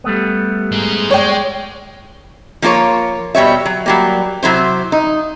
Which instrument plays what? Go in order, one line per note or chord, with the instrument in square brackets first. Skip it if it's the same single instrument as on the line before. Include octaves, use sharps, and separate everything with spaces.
[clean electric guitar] G3 A3 B3
[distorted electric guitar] G#3 D#4
[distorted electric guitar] G#3 [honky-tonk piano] C#5 D5 G5
[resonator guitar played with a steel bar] F3 A#3 F4 A#4 C#5
B2 G3 C#5 E5
F#3
F#3 G3 A#3
C3 F#3 E4 C5
D#4